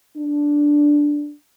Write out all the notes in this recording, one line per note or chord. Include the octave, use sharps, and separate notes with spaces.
D4